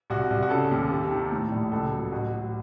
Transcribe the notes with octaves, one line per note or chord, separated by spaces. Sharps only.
C2 F#4
C2
F#4
C#3 A4
D#2
C3
D#3
A2
A#1
C#2 A4
F#3
A1 F#4
F#3